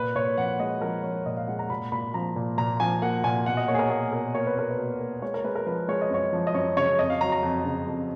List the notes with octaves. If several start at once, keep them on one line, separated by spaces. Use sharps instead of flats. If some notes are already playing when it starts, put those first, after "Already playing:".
Already playing: A#2 B4
A#2 C#5
F3 F#5
G#3 D#5
F3 A#4
F3 C#5
A#2 D#5
F5
G#3 F#5
A#5
A#2 B5
A#2 B5
F3 A#5
A#2
A#2 A#5
F3 G#5
A#3 F#5
A#2 G#5
B2 F#5
D#5
A#3 C#5
G#4
A#4
A#3 G#4
B2 A#4
A#3 C#5
B4
B2 A#4
B4
B2
A#3
G#3 C#5
A#4
G#3 B4
A#4
F3 B4
G#3 C#5
D#5
F#2 C#5
F3
D#5
F#2 C#5
C#3 C#5
F2 D#5
F5
F#3 A#5
A#5
F2
C#3
F2